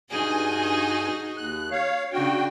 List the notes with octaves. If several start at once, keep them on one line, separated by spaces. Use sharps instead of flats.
G2 D#4 F#4 G#4 G#5
D#2 F#6
C#5 F5
C#3 D4 F#4 G5